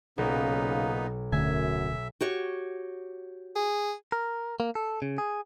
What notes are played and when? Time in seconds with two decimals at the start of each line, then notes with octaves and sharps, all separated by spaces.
0.18 B1 A#2 C#3 B3 C#4 D#4 F5
1.32 D1 F#2 D3 A3 E5 G#5
2.21 F#4 G4 C#5
3.56 G#4
4.12 A#4
4.60 A#3
4.75 A4
5.02 C#3
5.18 G#4